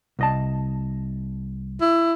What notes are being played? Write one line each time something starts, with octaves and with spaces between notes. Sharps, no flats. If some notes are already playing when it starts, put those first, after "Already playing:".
C2 D#5 A5
E4